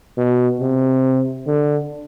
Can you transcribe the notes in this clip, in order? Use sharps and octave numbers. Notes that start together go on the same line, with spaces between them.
B2
C3
D3